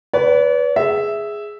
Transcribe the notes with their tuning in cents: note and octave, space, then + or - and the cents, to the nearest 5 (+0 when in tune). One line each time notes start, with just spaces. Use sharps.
B4 +0 D5 -45
G#4 +0 E5 +0